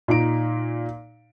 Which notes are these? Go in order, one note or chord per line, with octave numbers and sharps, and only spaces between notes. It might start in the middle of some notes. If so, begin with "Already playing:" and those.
A#2 D#4 A#5 D7